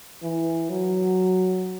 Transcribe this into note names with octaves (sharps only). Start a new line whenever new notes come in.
E3
F#3